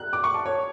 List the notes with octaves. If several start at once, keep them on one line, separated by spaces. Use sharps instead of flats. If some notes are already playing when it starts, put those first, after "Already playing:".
Already playing: F#6
D6
C#6
A5
C#5